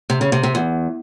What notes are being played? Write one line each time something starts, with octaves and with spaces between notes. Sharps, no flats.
C3
C#3
C3
C3
E2